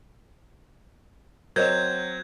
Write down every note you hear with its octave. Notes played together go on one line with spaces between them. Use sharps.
F#3 C4 A#4 C5 D#5 G6 G#6